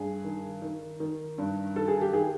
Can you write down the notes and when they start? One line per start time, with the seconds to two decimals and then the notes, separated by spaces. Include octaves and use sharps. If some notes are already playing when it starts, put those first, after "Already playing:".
Already playing: G2 G#4
0.24 D#3
0.62 D#3
1.00 D#3
1.38 G2
1.76 D#3 A4
1.88 G#4
2.01 G4
2.13 D#3 G#4